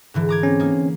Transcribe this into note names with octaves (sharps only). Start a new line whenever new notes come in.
G#2 D3 E3
A#5 D6 G#6
C4 C#4
A#3 D#4